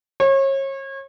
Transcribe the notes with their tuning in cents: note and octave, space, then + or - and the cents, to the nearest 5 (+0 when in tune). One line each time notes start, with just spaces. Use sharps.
C#5 -35